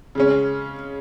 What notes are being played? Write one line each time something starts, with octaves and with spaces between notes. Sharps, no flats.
C#3 G#3 C#4